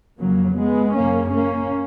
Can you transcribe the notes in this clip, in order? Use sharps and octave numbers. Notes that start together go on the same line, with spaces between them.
F2 C#3 F#3 A#3
G#3 B3
F#2 C#3 A#3 C#4
A#3 C#4